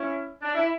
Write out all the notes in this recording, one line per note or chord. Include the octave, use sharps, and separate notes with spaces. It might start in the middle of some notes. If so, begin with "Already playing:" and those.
Already playing: C#4 E4
D4
E4